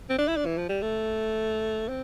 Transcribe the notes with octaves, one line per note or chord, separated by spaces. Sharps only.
C4
D4
E4
D4
E3
F3
G3
A3
C4